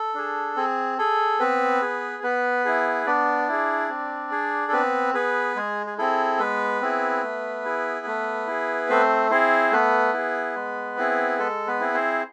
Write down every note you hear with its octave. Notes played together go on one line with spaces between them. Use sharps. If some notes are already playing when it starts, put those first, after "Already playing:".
Already playing: A4
D4 G#4
C4 G#4
G#4 A4
B3 C4 B4
G#4
B3 B4
E4 G#4
B3 D4 D5
E4 G#4
C4
G#4
A4
B3 C4 B4
B3 G#4 B4
G#3 G#4
G#4
C4 E4 G#4 A4
G#3 B3 B4
C4 E4 G#4
A3
E4 G#4
A3
E4 G#4
A3 C4 C5
C4 E4 G#4 C5
A3 B3 B4
E4 G#4
G#3
C4 E4 G#4
G#3 A4
B3 B4
C4 E4 G#4
C4 C5